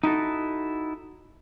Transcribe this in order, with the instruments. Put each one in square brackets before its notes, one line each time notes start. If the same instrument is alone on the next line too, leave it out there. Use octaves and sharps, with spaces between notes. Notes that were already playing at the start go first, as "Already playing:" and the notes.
[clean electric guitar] D#4 E4 F#4 A4